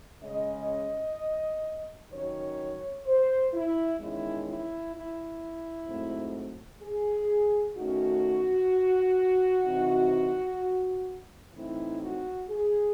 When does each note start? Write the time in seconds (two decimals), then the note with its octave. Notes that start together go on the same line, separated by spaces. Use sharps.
0.22 C#3 G#3 C#4 D#5
2.11 D#3 F#3 C#4 C#5
3.05 C5
3.53 E4
3.99 E2 D#3 G#3 C#4 E4
4.47 E4
4.94 E4
5.88 G#2 F#3 A3 C4
6.82 G#4
7.77 D#3 A3 C#4 F#4
9.65 C3 E3 C4 D#4
11.53 A2 E3 C4 D#4 E4
12.01 F#4
12.49 G#4